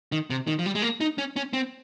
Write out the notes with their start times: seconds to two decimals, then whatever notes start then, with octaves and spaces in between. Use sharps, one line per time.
0.12 D#3
0.30 C3
0.47 D#3
0.59 F3
0.66 G3
0.75 G#3
0.82 A#3
1.01 D#4
1.18 C#4
1.36 C#4
1.53 C4